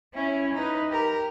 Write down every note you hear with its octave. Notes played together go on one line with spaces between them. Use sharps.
C#4 E4
D#4 B4
G4 A#4